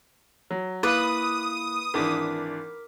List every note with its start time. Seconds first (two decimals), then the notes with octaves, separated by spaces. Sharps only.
0.51 F#3
0.83 A#3 E4 B4 F5 D6 D#6
1.94 G#1 E3 D4 A#4 D6 B6